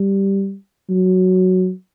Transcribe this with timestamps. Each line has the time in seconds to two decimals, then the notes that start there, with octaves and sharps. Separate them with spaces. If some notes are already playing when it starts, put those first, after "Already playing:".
Already playing: G3
0.89 F#3